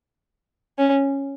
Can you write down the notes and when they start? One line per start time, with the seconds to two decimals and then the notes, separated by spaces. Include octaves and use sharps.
0.78 C#4